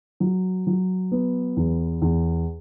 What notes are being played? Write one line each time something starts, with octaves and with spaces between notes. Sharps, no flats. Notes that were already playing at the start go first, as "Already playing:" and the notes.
F#3
F#3
B3
E2
E2